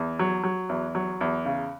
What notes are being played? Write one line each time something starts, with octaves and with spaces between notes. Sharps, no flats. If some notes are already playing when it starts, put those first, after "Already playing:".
Already playing: E2
F#3
F#3
E2
F#3
E2
C#3